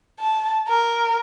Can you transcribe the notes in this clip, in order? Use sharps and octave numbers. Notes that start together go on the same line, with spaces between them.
A5
A#4